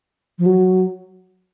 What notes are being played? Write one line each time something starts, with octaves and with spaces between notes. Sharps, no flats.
F3
F#3